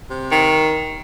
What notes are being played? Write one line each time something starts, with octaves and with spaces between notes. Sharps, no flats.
C3
D#3